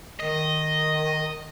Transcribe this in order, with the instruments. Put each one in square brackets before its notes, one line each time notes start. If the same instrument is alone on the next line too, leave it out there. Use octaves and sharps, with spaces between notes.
[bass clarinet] D#3 [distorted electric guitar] D#5